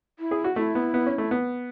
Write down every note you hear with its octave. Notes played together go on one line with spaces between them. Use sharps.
E4
G#4
F#4
A3 E4
B3
B3
C#4
A3
B3